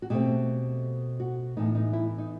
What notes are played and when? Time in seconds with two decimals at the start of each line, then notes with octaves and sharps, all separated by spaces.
0.02 F#4
0.10 B2 A3 C4 G4
1.20 F#4
1.57 A2 E3 B3 D#4
1.75 D#4
1.93 E4
2.18 D#4